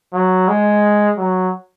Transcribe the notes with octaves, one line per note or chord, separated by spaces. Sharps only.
F#3
G#3
F#3